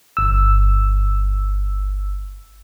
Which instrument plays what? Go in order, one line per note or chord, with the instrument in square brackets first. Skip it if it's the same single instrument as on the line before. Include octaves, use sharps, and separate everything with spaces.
[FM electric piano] G1 E6